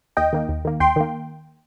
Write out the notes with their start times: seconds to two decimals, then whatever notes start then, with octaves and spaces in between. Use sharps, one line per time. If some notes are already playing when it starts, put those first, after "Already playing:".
0.17 D#2 D#5 G5
0.33 D#3 A#3
0.49 D#2
0.65 D#3 A#3
0.80 D#2 G5 C6
0.96 D#3 A#3